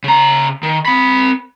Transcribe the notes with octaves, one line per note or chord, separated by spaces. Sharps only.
C#3 A#5
D#3
C4 B5